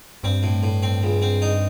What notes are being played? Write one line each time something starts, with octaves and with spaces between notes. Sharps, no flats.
G2 C4
A2
A2
C4
C#2
C4
D#4